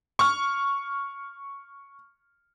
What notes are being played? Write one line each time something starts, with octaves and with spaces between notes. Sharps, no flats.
C#6 F6